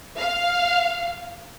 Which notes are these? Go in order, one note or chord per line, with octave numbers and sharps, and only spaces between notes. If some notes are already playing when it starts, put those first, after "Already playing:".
F5